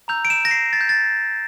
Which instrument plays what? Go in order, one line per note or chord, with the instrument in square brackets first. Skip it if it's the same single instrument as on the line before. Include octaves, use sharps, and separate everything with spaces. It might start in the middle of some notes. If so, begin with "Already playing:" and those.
[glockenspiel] A#5 E6 G6 F7
D7
E7
A#6
C7
A6
G6
A6